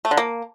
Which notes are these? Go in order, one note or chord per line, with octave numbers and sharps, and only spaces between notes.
A3
D3
A#3